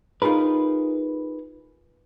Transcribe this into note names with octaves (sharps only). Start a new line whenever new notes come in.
D#4 F4 G#4 A#4 B4